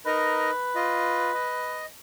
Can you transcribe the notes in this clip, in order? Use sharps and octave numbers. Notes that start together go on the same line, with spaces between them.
D#4 A#4 B4 D#5
F4 D#5
D#5